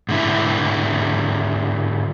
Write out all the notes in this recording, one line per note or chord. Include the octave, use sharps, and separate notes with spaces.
G#2 D3 E4